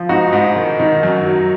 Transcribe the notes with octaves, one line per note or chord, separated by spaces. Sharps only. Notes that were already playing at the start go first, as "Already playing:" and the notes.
Already playing: F3
G#2 D#4 F#4
G#2
D#3
D#3
F#2
F#3